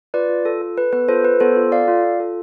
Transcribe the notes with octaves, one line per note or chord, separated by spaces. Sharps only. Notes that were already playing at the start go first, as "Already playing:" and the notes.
F4 B4 D5
F4
F4 A4
A4
A4 B4
B3 B4
F4 A4 C5
A4 B4
B3 A4 C5
F4
A4 D5 F5
F4
F4
A4